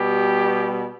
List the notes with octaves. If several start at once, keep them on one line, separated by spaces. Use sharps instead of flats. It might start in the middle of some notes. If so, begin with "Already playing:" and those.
Already playing: B2 G3 G4